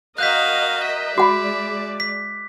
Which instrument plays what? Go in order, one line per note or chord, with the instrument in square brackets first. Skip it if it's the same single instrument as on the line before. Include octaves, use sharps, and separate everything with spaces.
[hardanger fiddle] F#4 F5 [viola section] A#4 D#5 [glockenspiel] F#6 G6 B6
[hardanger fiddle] E5
[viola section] G#3 D5 [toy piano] F#4 F#5 B5 [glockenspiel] D6
[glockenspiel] B6